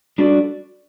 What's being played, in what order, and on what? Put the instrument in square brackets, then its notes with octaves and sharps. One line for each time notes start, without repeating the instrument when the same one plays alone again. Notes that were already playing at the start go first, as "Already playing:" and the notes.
[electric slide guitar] G3 D4 F#4 A4 D5